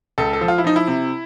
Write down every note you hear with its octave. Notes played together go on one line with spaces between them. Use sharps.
C#2 A4
A4
F3
F4
E4
F3 D#4
E4
C3